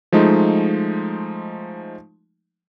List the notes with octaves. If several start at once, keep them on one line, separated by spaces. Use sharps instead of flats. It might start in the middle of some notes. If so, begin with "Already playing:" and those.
F3 G#3 A3 D#4